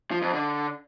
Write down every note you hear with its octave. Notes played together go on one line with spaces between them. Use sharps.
F3
F2
D3